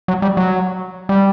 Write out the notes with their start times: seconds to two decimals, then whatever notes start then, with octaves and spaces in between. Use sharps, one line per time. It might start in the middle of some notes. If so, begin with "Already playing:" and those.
0.08 F#3
0.22 G3
0.37 F#3
1.09 G3